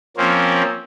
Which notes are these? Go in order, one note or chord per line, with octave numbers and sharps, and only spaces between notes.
F3 A#3 C4 C#4